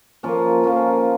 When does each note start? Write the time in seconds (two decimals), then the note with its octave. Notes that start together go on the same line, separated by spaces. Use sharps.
0.23 F3 A#3 C#4 F4
0.64 F3 A#3 C#4 F4